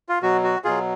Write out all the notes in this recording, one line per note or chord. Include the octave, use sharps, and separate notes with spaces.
F4
B2 F#3 F#4
F#4
B2 F#3 F4 G#4